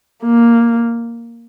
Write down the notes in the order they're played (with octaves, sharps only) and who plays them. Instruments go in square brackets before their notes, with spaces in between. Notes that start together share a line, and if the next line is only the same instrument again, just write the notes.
[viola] A#3